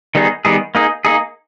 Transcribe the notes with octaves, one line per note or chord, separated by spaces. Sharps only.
D#3 G3 B3 D#4 G#4
D#3 G3 B3 D#4 G#4
A#3 D#4 G#4
A#3 D#4 G#4